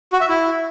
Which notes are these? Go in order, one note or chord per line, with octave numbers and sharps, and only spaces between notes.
F#4
E5
E4